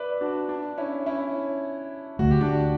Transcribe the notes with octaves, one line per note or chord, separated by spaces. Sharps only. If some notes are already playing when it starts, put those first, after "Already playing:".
Already playing: B4 D5 E5
D4 F#4
D4
C#4 E4
C#4 E4
D2 D3 A3 F#4
G4
D4 F#4